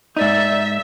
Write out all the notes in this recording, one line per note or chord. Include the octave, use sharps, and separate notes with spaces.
G#2 D#4 D5 E5